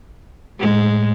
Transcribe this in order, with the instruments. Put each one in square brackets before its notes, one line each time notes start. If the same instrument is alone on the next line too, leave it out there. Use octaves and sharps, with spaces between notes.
[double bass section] A2 [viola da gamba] G#3